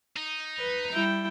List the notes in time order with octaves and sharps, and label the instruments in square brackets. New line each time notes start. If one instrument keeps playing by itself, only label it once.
[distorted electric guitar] D#4
[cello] B4
[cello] G3 [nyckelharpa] E4 G5